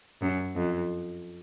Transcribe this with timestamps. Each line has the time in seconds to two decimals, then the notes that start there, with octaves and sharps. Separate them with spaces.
0.22 F#2
0.56 F2